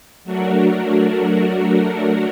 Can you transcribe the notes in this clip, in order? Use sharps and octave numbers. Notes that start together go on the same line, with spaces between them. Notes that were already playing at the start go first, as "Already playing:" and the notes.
F#3 A3 D4 F#4 A#4